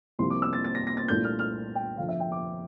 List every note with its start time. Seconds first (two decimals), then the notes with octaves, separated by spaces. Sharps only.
0.19 C2 C3 F3 A#3 F4 C6
0.30 D6
0.42 E6
0.53 A6
0.64 A6
0.75 A#6
0.87 A#6
0.97 A6
1.08 C2 A#2 A3 D4 G6
1.24 F6
1.39 F6
1.75 G5
1.97 F1 F2 D3 F3 F5
2.08 E5
2.20 G5
2.32 D6